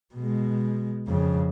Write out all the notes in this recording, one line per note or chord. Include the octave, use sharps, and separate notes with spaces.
B2 G#3
F2 C#3